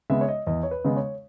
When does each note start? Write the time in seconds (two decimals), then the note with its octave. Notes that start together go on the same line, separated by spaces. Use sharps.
0.10 C#3 G#3 B3 E5
0.21 C#5
0.28 D#5
0.47 E2 D#5
0.63 C#5
0.71 B4
0.85 C#3 G#3 B3 D#5
0.97 C#5